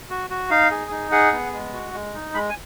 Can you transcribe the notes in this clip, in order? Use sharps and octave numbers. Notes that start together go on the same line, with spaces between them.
F#4
F#4
D#4 F5
G#4
D#4
G#4 F#5
B3
G#3
F#4
G#3
D#4
G#3 B5
G#5